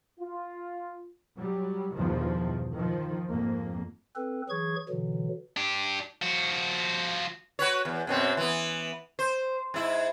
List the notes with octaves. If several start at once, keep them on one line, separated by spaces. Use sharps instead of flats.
F4
F#3 G3
E2 G2 B2 D#3 F3
D#3 F3
F2 G#2 A#3
C4 A4 B4
E3 F#3 G#4 C#6 G#6
B2 D3 E3 F#3
D4 G4
F3 F#4
F#4 B4 C#5
E2
F#2 B2 C4
E3 B3
C5
G#2 E4